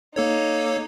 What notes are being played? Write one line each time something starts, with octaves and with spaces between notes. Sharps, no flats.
A#3 D#4 A4 C#5